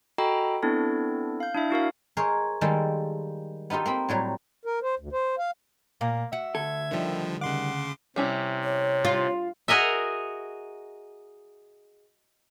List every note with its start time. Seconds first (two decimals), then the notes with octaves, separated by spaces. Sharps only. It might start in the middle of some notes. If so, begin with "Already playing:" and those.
0.18 F#4 A4 D#5 G5 A#5 B5
0.63 B3 C4 D4 E4 A4
1.40 F5 G6
1.55 D4 E4 E5
1.71 E4 F#4 A#4 F5
2.17 G#4 A#4 C5 C#5 D#5
2.61 D#3 G3 G#3 A#3 A4
3.70 B3 D#4 F4 G4 A4
3.86 A#3 C4 B5
4.09 A2 F#3 G3
4.65 A#4
4.82 C5
4.99 D2
5.12 C5
5.39 F5
6.01 A#2 A#3
6.33 F#4 E5
6.55 D2 A4 G#6
6.91 D3 D#3 F3 G3
7.41 C#3 F#5 C6 D6
8.16 C3 G3 C#4 E4
8.64 C#5
9.05 F4
9.68 F#4 G#4 A#4 D#5 E5